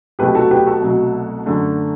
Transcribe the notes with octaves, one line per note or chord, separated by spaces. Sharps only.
C2 B2 F#3 A3 G4 B4
F#4 A4
G4 B4
F#4 A4
C2 B2 F#3 A3
F#2 D3 A3